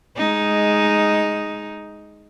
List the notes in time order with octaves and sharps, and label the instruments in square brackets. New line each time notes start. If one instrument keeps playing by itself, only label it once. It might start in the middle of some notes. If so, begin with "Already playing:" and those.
[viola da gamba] G#3 D#4